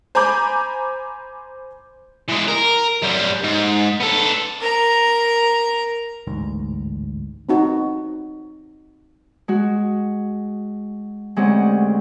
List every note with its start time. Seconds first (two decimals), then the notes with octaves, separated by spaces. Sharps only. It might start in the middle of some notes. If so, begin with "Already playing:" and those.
0.15 C5 G#5 A#5 B5 D6 G6
2.29 E3 G#3
2.48 A#4
3.02 F#2 G3
3.44 G#2
4.00 B3 A4
4.60 A#4 A#5
6.27 A1 D2 G#2
7.49 C4 D#4 F#4
9.48 G#3 F#4
11.36 D2 G#3 C4 C#4 G4 F#5